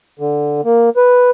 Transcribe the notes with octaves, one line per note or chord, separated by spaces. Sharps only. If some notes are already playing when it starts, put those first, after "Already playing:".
D3
A#3
B4